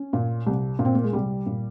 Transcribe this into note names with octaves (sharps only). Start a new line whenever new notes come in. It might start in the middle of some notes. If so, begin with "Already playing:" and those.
Already playing: C#4
A#2
C2
A#2
C4
A#3
G#3
C2 G3
A#2